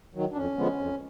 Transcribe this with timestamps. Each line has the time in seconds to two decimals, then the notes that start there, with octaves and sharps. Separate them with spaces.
0.15 D#3 F#3
0.32 D4
0.36 F2 C#4
0.57 D3 F3 G#3 B3
0.79 F2